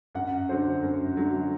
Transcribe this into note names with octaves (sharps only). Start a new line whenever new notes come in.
F#2 F#5
D3 F#3 A3 C5
F#2
D3 F#3 A3